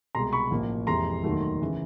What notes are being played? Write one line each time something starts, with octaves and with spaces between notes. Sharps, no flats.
C2 B2 G#3 A#5 C6
B5 C#6
A1 A2 F3 A#3
F2 C3 E3 G#3 A#5 C6
E1 D#2 D#3 F#3 A3
C#3 E3